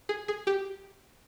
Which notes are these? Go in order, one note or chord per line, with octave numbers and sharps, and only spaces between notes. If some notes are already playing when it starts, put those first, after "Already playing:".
G#4
G#4
G4